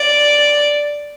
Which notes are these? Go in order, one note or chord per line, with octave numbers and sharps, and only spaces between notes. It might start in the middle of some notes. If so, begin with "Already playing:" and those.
Already playing: D5